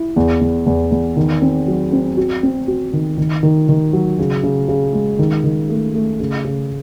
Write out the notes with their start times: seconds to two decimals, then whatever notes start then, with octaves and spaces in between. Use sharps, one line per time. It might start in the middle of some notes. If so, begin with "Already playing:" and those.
Already playing: E4
0.16 E2
0.41 E2
0.66 E2
0.91 E2
1.17 D#3
1.42 C4
1.67 F#3
1.92 C4
2.17 F#4
2.43 C4
2.67 F#4
2.93 D#3
3.18 D#3
3.43 D#3
3.69 D#3
3.93 F#3
4.19 C#3
4.43 C#3
4.68 C#3
4.93 G#3
5.19 D#3
5.44 D#3
5.69 A3
5.94 A3
6.20 C#3
6.44 C#3